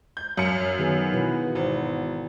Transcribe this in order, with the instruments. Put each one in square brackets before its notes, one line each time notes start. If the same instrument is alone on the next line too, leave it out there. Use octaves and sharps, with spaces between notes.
[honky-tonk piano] G6
[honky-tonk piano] F#2 C#7 [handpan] F5
[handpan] D#3 B3 G#4
B2 E3 B4
[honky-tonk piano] G#1